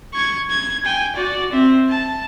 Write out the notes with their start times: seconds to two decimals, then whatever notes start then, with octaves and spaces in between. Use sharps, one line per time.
0.14 C#6 G#6
0.50 G#6
0.85 G5 G#5
1.16 F#4 D5
1.52 C4 E5
1.90 A5